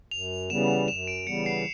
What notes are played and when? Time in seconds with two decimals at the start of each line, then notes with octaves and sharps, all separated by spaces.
0.11 F#2 F7
0.50 C#3 E3 G3 B3 E7
0.88 F#2 E7
1.07 D7
1.26 C#3 E3 G3 B3 C#7
1.46 C7